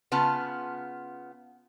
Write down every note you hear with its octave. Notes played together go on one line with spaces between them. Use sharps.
C#3 B3 F4 A5